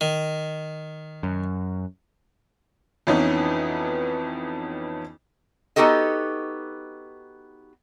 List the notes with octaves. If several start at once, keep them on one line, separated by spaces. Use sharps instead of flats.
D#3
F#2
F2 E3 B3 C#4 D#4
B3 D#4 F#4 G4 A4 D#5